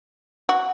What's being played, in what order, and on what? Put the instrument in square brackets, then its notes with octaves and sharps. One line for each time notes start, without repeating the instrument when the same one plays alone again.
[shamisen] F#4